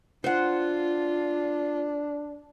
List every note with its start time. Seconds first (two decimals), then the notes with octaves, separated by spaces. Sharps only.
0.24 D4 F4 C5 F#5